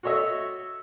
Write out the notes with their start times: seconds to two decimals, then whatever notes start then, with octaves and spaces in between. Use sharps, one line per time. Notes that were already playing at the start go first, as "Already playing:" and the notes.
0.03 F#4 A4 C#5 D#5 E5